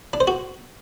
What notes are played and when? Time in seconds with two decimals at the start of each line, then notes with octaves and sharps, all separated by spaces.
0.13 D4
0.20 C5
0.27 F#4